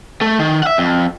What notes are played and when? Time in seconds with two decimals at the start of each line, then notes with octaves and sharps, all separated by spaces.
0.21 A3
0.39 D#3
0.63 E5 F#5
0.78 F2